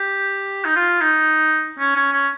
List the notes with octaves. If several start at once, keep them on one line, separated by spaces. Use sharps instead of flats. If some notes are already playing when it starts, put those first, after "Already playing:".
Already playing: G4
D#4
F4
D#4
C#4
C#4
C#4